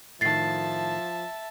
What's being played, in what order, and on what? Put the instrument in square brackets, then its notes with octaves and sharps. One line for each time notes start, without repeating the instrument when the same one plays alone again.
[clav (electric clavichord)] A2 D#3 [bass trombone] F3 [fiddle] E5 A5 [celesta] A6 C7